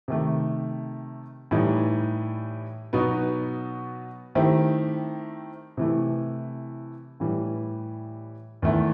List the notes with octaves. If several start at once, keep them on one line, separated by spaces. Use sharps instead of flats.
C3 D#3 A3
A2 E3 G3 D#4
B2 F#3 B3 D#4 F#4
D#3 A3 C4 E4 G4
C3 E3 A3 E4
A2 E3 G3
E2 D#3 A3 E4